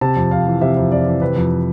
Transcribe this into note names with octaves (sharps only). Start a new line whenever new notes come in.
C3 A5
F2
F2 F5
E3
C3 E5
F2
F2 D5
E3
C3 B4
F2